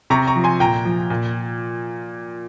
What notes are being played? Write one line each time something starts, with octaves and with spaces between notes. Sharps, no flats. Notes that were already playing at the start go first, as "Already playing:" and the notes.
C3 A#5 C#6
A#5 C#6
F3
G#5 C6
A#2 G5 A#5
F3
A#2